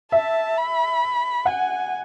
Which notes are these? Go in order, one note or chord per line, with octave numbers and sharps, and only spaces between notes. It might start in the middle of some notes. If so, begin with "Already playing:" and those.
E5 A5
B5
F#5 G#5